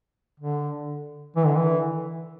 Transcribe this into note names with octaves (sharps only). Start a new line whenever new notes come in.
D3
E3
D3
E3